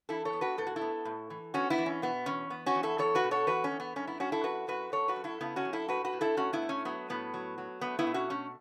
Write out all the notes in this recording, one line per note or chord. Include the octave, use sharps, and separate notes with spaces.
E3 E4 A4
A4 C#5
B3
F#4 B4
A2 A4
F#4
E4 A4
B3
A2
E3
B3 C#4 F#4
B3 E4
E3
C#4
B2 B3
E2 C#4
B3
C#4 F#4
E2
E4 A4
E2 A4 C#5
F#4 B4
B2
A4 C#5
E2 F#4 B4
C#4
E2
B3
F#2 C#4
B3 E4
F#2 C#4 F#4
E4 A4
F#2 F#4 B4
F#2 F#4 B4
F#2 A4 C#5
F#4 B4
F#2
E4 A4
C#3 B3 E4
C#4 F#4
F#2
E4 A4
A2 F#4 B4
F#4 B4
A2
E4 A4
A2 C#4 F#4
B3 E4
A3
C#4
F#3 B3
A2 B3
F#3
F#3
A3 B3
B3 E4
B2
C#4 F#4
A3 C#4